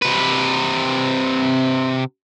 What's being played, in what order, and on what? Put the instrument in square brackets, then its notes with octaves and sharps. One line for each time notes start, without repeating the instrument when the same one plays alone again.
[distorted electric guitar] C3 B4